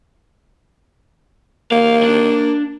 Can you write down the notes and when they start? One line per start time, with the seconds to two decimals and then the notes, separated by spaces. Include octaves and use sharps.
1.71 A#3 F5
2.03 D4